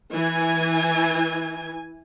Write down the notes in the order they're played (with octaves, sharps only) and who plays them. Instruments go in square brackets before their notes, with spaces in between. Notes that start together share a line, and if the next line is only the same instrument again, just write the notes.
[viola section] E3 G#5